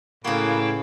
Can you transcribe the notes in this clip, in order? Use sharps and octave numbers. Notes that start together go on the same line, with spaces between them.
A2 C#3 A#3 B3 E4 F#4 F5 G5